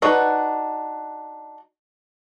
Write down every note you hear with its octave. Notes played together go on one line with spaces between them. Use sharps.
D4 D#4 F#4 B4